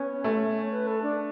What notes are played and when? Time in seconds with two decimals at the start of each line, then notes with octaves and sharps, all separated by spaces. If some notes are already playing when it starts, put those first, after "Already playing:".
Already playing: B3 C#4
0.24 A3
0.71 B4
0.87 A4
1.03 D4